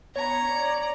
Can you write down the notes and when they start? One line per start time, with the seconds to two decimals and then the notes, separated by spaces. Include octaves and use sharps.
0.16 B3 C#5 A#5
0.51 D5